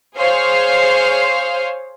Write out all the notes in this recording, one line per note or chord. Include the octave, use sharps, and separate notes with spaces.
G#4 C5 C#5 F5